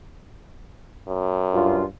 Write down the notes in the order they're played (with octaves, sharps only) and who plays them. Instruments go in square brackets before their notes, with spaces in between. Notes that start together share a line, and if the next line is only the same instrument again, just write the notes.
[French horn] F#2
[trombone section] G2 F4